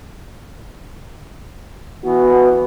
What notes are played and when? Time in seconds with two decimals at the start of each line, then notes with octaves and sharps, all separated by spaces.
2.04 E3 B3 F#4